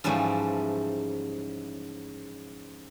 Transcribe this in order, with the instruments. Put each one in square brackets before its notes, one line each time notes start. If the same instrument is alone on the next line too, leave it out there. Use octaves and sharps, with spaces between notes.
[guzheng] G#2 C#3 E3 F3 G3 A3